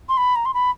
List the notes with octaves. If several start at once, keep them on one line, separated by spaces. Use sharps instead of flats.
C6
B5
A#5
C6
B5